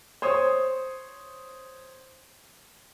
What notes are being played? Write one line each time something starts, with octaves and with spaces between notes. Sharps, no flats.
C5 C#5 D#6